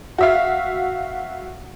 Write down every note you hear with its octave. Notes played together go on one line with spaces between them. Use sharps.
F#4 E5 F5